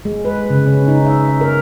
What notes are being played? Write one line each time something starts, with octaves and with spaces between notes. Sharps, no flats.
G#3
B4
C#3
C#4
D#4
E5
A#4